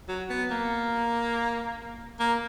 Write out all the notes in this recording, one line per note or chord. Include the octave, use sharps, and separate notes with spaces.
F#3
B3
A#3
A#3